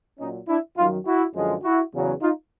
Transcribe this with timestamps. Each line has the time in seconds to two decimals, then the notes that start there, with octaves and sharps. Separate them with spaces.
0.19 A#2 F#3 C#4 D#4
0.48 D4 E4
0.77 F#2 D#3 F#3 D#4 F4
1.06 E4 F#4
1.35 F#2 D3 F3 G#3
1.64 E4 F#4
1.93 E2 C#3 F#3
2.21 D#4 F4